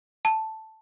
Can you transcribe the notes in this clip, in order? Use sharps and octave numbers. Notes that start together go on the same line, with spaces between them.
A5